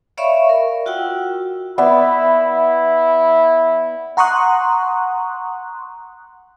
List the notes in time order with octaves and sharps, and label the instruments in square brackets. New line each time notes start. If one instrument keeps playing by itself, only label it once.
[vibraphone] C#5 D5 E5 F5 B5 C#6
A#4
F4 F#4 F#5 G5 E6
[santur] B3 D5 E5 [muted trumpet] E4
[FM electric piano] F#5 A#5 C6 C#6 D#6 F#6